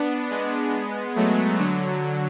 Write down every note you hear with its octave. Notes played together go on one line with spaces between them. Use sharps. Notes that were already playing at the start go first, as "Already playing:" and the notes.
Already playing: B3 D4
G#3 B3
F#3 A3
D3 F#3